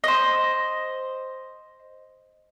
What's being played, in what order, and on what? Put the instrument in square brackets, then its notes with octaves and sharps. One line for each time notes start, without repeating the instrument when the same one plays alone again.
[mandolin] C5 D#5